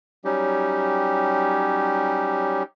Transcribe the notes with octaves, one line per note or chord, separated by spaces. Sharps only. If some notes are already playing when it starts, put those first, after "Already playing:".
F#3 G3 C#4 D#4 G4